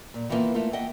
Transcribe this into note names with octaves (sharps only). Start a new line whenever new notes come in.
A#2
D#3 E3 G3 A#3 B3 F4
A3 A#3 F4 A#4
D#5 E5 F#5 G5